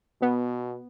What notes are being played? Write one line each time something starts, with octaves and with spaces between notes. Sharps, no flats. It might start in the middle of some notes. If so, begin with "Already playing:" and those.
B2 B3